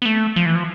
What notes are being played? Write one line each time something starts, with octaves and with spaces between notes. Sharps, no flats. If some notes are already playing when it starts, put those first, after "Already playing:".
B3
A3
F3
E3
F3